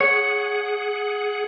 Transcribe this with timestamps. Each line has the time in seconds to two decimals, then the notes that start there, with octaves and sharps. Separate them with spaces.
0.01 G#4 C#5 F#5